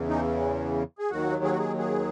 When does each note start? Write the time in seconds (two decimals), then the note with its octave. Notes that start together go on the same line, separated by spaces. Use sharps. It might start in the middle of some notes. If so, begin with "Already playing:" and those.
Already playing: E2 C#3 E3
0.09 D#4
0.99 G#4
1.11 D#2 D#3 F#3 F#4
1.44 G#4
1.51 F#4
1.59 G#4
1.78 G#4